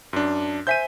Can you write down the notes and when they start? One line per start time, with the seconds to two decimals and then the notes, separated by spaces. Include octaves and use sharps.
0.13 F#2 D4
0.67 C5 E5 G#5 G6 B6 D#7